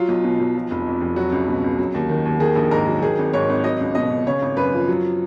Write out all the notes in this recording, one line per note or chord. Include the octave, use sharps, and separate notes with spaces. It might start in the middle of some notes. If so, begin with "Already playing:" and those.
Already playing: F#3 F4
B1
B2
B1
F3
F1
F2
F1
F#3 F#4
C#2
B2
C#2
F#3
D#2
D#3
D#2
D#3 G#4
A#1
G#2 A#4
F#3
D#3 G#4
G#1
G#2 C#5
G#1
F#3 D#5
C#2
B2 D#5
C#2
C#3 C#5
G#1
F#2 B4
F3
F#3